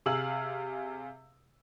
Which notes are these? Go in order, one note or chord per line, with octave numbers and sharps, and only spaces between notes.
C3 G#4 F5 E6 F#7